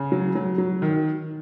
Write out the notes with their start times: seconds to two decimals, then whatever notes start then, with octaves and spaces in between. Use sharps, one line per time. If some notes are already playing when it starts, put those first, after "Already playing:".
Already playing: C#3
0.12 F#3
0.35 F#3
0.58 F#3
0.82 D#3